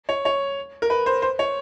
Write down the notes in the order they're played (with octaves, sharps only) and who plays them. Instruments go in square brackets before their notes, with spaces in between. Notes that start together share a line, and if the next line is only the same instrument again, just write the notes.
[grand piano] C#5
C#5
A#4
B4
C5
C5
C#5